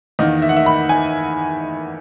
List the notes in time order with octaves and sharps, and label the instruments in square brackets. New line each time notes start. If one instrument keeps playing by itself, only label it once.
[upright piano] E2 D#3 A#3 D#5
E5
F#5
E5
B5
G#5